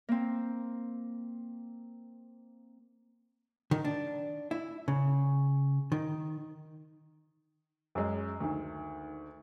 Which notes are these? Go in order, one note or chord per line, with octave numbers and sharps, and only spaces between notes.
A#3 C4
D#3
D4
E4
C#3
D#3
F#2 G#3
D2 D#3